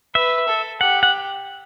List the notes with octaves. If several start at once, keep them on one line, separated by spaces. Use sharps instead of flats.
B4 E5
A4
G4 F#5
F#5